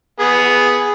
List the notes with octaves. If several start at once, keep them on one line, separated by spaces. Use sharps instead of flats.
B3 G#4